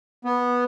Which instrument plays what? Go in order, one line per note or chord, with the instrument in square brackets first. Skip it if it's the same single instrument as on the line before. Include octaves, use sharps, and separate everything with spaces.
[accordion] B3